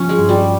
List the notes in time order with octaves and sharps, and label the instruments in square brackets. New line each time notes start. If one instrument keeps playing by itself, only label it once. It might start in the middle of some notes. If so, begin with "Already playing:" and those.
Already playing: [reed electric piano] F3 F4 [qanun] C#4
[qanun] G#3
[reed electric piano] G2
[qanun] G3